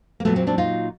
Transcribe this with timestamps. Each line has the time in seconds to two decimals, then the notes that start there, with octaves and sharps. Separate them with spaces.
0.20 A#3
0.25 A#2 F#3 A3 B3
0.36 A#3 C4
0.47 C4 D4
0.58 D#4 F4